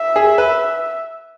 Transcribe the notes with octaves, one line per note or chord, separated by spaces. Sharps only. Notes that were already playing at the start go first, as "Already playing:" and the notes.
Already playing: E5
G#4
B4